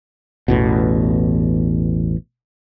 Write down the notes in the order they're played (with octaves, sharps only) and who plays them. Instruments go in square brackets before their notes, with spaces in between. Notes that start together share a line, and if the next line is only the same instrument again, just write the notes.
[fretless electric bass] A1 E2 B2